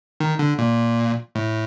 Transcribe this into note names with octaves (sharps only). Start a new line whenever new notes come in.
D#3
D3
A#2
A2